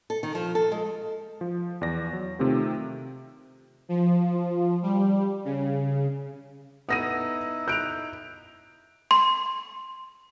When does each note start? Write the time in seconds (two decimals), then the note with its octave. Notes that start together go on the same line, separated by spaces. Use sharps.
0.10 A4
0.23 D#3
0.35 F3
0.55 A4
0.72 G#3
1.41 F3
1.81 E2 D5 A#6
2.13 F#3
2.39 C3 D#3 A3 C4 F4 G4
3.89 F3
4.82 G3
5.45 C#3
6.89 B3 D#4 E4 D#6 A#6 D#7
7.68 F#6 G6 D7 F7
9.11 C6